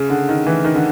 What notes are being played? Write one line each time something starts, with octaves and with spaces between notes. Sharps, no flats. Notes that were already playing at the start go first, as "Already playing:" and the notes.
Already playing: C#3
D3
D#3
E3
D#3
D3